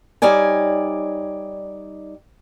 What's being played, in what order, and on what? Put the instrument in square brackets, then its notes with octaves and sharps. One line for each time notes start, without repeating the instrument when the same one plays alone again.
[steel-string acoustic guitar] G3 D#4 C#5 D5 G#5